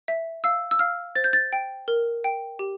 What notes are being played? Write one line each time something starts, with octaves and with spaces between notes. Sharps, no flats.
E5
F5 E6
E6
F5 F6
C5 A6
G6
A6
G5
A#4
G5
G4